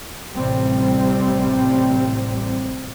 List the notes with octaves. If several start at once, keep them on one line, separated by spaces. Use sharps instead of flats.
A1 A2 C3 G3 C4